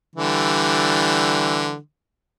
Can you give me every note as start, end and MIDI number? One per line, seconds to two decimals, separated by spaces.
0.16 1.77 50
0.16 1.77 52
0.16 1.77 55